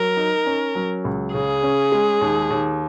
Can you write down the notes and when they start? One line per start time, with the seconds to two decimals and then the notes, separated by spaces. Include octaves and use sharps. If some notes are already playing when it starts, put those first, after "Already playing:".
Already playing: F#3 A#4
0.17 D#4
0.46 C#4
0.75 F#3
1.05 C#2
1.34 C#3 G#4
1.63 C#4
1.92 G#3
2.21 D#2
2.50 D#2